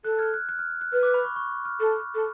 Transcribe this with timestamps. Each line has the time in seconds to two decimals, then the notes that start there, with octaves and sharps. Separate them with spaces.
0.04 A4 F#6
0.19 F6 G#6
0.34 F#6
0.49 F#6
0.59 F6
0.81 F#6
0.92 B4 F6
1.03 D6
1.14 B5
1.25 C#6
1.36 C#6
1.65 F6
1.80 A4
2.15 A4